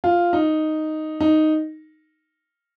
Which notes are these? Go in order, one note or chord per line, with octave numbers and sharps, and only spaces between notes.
F4
D#4
D#4